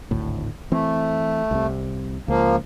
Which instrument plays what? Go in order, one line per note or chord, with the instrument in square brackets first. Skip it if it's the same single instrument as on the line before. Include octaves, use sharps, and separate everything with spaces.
[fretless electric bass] G#1 D2 A2
[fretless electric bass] E3 C4 [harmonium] A3
[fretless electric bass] C2 C3
[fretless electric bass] C#2 [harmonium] F3 A#3